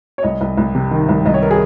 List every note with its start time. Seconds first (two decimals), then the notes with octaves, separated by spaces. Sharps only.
0.18 C#5
0.23 C2 D#5
0.41 C2
0.57 C2
0.75 C3
0.91 D#3
1.09 C2
1.26 C2 D#5
1.34 C#5
1.42 A#4
1.51 G#4